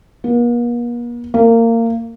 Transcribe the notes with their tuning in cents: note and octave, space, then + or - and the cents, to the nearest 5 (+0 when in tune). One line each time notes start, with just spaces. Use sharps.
A#3 +45
A#3 -25